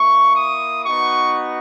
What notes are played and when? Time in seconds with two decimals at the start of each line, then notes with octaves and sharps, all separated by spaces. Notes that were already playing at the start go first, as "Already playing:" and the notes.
Already playing: A#3 E4 C#6
0.35 D#6
0.84 B3 D#4 F#4 C#6